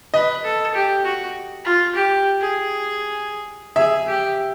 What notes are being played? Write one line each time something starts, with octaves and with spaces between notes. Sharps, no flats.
B4 D#5
A4
G4
F#4
F4
G4
G#4
G#4 E5
G4